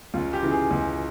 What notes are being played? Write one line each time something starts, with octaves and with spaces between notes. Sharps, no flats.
C#2 F4
G4
C#3 E3
G#4
C#2